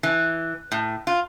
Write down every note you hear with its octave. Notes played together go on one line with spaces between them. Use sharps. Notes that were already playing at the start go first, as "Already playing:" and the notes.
E3
A2
F4